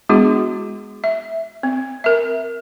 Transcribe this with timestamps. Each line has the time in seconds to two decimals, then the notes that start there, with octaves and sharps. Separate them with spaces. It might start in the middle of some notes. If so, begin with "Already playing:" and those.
0.09 G#3 B3 D4 E4 F#4 G#4
1.04 E5
1.63 C4
2.04 A#4 E5